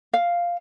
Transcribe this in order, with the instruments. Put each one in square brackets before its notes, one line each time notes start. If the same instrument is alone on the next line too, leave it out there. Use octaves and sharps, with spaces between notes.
[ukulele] F5